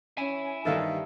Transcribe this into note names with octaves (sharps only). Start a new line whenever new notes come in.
C#4 E4 G#5
G2 D#3 E3 D#4 G4 A4 E5 F5